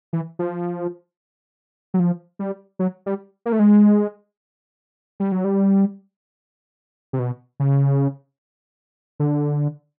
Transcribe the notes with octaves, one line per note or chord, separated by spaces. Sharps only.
E3
F3
F#3
F3
G3
F#3
G3
A#3
A3
G#3
G3
F#3
G3
C3
B2
C#3
D3